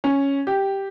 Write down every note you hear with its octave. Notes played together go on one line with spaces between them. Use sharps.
C#4
G4